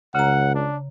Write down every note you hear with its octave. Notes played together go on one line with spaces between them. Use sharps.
C#2 C#3 F#5 A#5
D4